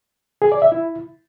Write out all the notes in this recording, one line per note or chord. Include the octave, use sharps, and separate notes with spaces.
G#4
D5
E5
E4